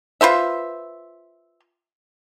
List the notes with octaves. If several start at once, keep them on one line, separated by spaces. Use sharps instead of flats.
F4 B4 C5 E5